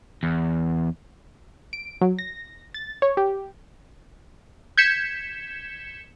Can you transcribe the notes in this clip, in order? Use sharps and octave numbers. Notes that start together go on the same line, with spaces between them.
E2
D7
F#3
A#6
A6
C#5
G4
G6 G#6 B6 C#7 E7